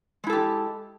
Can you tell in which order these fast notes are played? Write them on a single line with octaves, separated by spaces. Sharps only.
G#3 E4 A4 G4